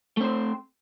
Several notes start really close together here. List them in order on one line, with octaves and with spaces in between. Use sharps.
A3 C4 C5